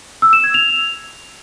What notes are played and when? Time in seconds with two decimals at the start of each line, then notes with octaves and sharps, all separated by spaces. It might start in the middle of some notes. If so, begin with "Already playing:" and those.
0.22 E6
0.33 E7
0.44 G#6
0.54 F7